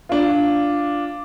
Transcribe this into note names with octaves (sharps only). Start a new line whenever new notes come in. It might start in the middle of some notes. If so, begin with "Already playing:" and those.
D4 F4